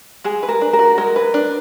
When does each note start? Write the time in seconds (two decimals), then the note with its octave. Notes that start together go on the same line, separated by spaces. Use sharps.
0.24 G#3 G#4
0.43 B4
0.49 A#4
0.61 D4
0.73 A#4
0.79 F#4
0.98 G#3 A#4
1.16 B4
1.34 D4